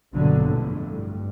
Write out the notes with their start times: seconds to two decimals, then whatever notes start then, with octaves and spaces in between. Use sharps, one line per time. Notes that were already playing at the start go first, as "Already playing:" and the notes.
0.13 A#1 G2 B2 D3 F#3
0.45 F2 A2
0.91 G2